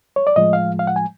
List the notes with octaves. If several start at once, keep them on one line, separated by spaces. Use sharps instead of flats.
C#5
D5
A2 F3 G#3 D#5
F5
F5
F#5
G#5